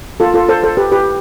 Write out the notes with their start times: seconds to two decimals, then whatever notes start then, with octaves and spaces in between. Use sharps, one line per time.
0.20 F4 A4
0.34 F4 A4
0.49 A4 C5
0.63 A4 C5
0.77 G4 B4
0.92 G4 B4